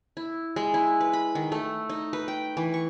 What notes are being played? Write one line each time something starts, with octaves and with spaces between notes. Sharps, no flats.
E4
G#3
E4
B4
B5
D#3
A3
D#4
B4
G5
E3
C#6